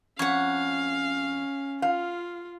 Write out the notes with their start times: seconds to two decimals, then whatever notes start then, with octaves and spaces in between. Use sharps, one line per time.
0.19 F2 C#4 C#5 F5 F#5
1.82 F4 F5